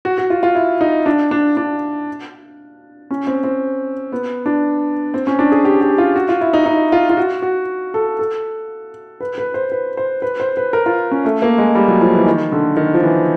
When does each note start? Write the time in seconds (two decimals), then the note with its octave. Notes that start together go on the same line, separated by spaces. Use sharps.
0.05 F#4
0.18 F#4
0.30 F4
0.43 F4
0.55 E4
0.81 D#4
1.06 D4
1.31 D4
1.57 D4
3.11 C#4
3.27 C4
3.44 C4
4.12 B3
4.46 D4
5.14 C4
5.27 C#4
5.39 D4
5.52 G#4
5.65 G4
5.81 G4
5.98 F4
6.16 F#4
6.29 F4
6.41 E4
6.53 D#4
6.66 D#4
6.92 F4
7.10 F4
7.17 F#4
7.42 F#4
7.94 A4
8.19 A4
9.21 B4
9.38 B4
9.54 C5
9.72 B4
9.97 C5
10.22 B4
10.40 C5
10.57 B4
10.73 A#4
10.86 F4
11.11 C#4
11.25 A3
11.42 A#3
11.58 G#3
11.75 G3
11.88 F#3
12.01 F3
12.14 E3
12.27 D#3
12.52 D3
12.77 D#3
12.94 F3
13.03 E3